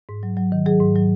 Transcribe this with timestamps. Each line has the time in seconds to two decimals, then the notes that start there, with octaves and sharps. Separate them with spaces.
0.09 G#2
0.23 F#3
0.37 F#3
0.52 D#3
0.66 F#3 G#4
0.80 G#2
0.96 F#3